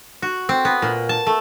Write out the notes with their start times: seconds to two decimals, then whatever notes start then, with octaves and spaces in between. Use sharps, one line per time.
0.22 F#4
0.49 C4
0.65 B3
0.82 A#2
1.09 A5
1.27 A3